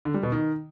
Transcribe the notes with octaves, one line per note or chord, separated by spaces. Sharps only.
D3
G3
B2
D#3